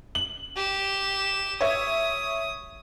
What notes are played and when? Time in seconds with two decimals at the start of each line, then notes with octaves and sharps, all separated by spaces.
0.15 F#7
0.56 G4 E7
1.61 C#5 E5 D#6 G#6